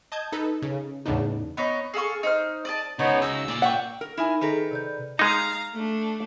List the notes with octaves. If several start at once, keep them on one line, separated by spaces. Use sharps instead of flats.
D#5 A5 D#6 G6 G#6
D#4 A4 B4
C#3
E2 A2 C#3 B3 D4 D#4
B3 D#4 C#5
G#4 A4 F5 C#6
D#4 C5 F6
D5 D#5 A5
C#3 G#3 B3 D#4 C5 C#5
D#4 F#4 C#5 E6
A#2 F4 D5 F5
E5 F#5 G5 C#6
A#4
D#4 E4 A#4 E5 G#5
D#3 G#4 A4 B4 A#5
C3 D5 G6
G#3 D#4 F5 A#5
A3 D4